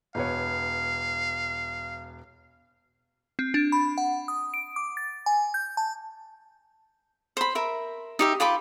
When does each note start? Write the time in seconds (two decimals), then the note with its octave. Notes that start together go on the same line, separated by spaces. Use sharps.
0.15 E1 B3 C#5 F5
3.39 C4
3.54 D4
3.72 B5
3.98 F#5
4.28 D#6
4.54 D7
4.76 D6
4.97 A6
5.26 G#5
5.54 G6
5.77 A5
7.37 C5 B5
7.55 A#4 E5
8.19 D#4 G4 E5
8.40 F4 G4 B5 D6